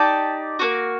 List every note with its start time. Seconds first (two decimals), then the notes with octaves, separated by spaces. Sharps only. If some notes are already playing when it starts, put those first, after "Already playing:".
Already playing: D#4 G4 D5 A5
0.59 A#3 D4 F#4